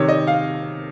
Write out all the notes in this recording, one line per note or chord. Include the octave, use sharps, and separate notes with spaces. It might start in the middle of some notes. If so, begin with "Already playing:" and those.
Already playing: C3 D#3 C#5
D#5
F5